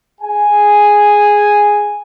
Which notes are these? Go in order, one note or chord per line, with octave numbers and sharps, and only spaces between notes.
G#4 G#5